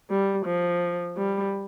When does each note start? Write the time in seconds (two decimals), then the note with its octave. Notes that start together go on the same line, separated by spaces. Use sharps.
0.10 G3
0.46 F3
1.17 G3